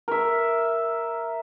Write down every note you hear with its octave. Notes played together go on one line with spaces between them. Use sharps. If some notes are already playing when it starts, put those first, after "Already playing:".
A#4 E5